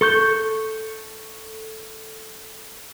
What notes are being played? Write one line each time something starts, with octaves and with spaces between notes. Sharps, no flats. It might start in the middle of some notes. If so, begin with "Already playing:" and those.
A4 C#6 G6